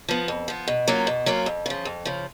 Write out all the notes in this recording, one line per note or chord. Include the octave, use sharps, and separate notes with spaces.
F3 B3
F2
F3 B3
B2
F#3 A#3 C#4 F4
B2
F#3 A#3 C#4 F4
F2
C#3 F3
F2
C#3 F3